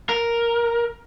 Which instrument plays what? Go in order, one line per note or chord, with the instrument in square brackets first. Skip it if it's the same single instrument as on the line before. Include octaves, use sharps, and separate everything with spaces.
[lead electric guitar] A#4